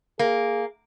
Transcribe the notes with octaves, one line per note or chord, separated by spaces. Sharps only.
A#3 G#4